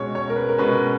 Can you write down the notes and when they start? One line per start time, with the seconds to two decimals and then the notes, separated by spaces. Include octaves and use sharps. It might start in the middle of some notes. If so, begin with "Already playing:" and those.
Already playing: B2 G#3 C#4 C#5
0.15 C#5
0.30 A#4
0.36 B4
0.49 A#4
0.58 B2 G#3 C#4 B4